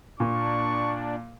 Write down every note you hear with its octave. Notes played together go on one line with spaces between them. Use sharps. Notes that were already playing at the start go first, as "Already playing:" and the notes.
A#2 A#3 D4 C#6